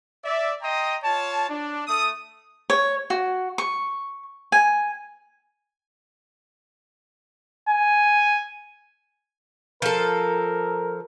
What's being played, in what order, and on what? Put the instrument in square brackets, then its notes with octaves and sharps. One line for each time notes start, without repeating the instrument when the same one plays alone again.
[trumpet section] D5 E5
D#5 G5 A#5 C6 D#6
F4 C#5 A5
D4
A3 D#6
[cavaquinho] C#5
F#4
C#6
G#5
[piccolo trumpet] G#5
[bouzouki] F3 A4 [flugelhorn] A#4